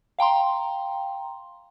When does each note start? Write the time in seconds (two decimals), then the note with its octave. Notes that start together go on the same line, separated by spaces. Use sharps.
0.19 F5 G5 A#5 C6